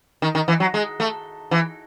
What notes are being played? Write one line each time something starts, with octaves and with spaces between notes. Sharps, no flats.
D#3
D#3
E3
F#3
G#3
A3
E3